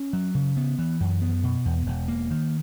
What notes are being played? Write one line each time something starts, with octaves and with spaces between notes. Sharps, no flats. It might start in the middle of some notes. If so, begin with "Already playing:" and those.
Already playing: C#4
F#3
C#3
B3
E3
F#2
B3
B2
E2
E1
A#3
D#3